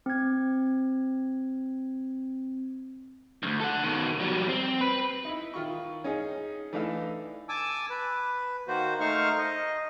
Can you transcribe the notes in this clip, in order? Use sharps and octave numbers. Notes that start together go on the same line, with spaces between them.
C4 G#6
D2 G2
A4 F#5
B2 D#3
F#3 G3
C4
B4
D#4 E4
D#3 F4 C#6
C#4 D#4 G#4
E3 A3 D4 D#4 F5 E6
G#5 A5 D6 E6
B4
D#3 A#3 F#4 C5
A3 D#4 C5 F5 C#6 F6
D#5